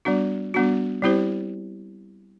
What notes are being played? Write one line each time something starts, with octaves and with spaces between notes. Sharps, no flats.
G3 B3 D4 F#4
G3 B3 D4 F#4
G3 C4 E4 G4 C5